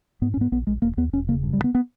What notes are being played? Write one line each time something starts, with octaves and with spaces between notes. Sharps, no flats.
G#2 B3
C#4
G#2 B3
A#1 B3
A#1 G#3
E1 A#3
D#2 B3
E1 C#4
C#3 A#3
G2
G3
G2
B3
B3